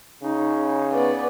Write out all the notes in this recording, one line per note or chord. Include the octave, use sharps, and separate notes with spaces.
C#3 D#4
B3 D5